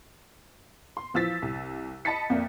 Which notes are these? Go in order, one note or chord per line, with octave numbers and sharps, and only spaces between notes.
C6
E3 F3 E6 A6 B6
C2
D#5 A5 B5 A6 B6 C#7
F2 A#3 D5 E5